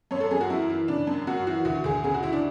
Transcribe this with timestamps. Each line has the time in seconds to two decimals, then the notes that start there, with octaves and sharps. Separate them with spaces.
0.11 F#2 C#5
0.20 A4
0.31 F#2 G#4
0.41 F#4
0.50 F#2 E4
0.70 E3
0.88 C#3 D4
1.07 F#2
1.27 F#2 F#4
1.47 E3 F#4
1.65 D2 F#4
1.84 D2 G#4
2.04 C#3 G#4
2.14 F#4
2.23 D2 E4
2.33 D4